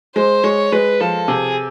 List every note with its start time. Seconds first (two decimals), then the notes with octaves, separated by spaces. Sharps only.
0.16 G#3 C5
0.43 G#3 C#5
0.72 G#3 B4
1.00 F3 A4
1.28 C3 G#4